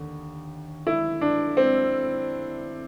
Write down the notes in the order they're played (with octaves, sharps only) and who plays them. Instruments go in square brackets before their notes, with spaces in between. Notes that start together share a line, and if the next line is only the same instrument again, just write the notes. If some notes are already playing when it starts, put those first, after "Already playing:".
Already playing: [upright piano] D#2 D3
E4
D4
C4